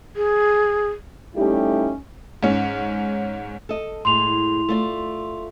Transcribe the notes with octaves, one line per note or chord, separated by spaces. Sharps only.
G#4
G3 A3 C#4 D#4 E4 G4
G#2 C#4
A4 D#5
A2 G#3 C6 F7
A3 F4 D5